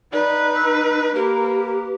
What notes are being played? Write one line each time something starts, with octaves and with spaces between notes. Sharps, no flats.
D#4 B4 D5
E6
A#3 G4 A#4 B4